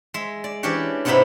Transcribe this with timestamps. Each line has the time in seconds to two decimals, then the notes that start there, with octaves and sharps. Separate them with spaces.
0.14 G#3 E5
0.44 D5
0.63 E3 C#4 D4 G4 C#5
1.05 G#2 C3 B3 D#4 E4 B5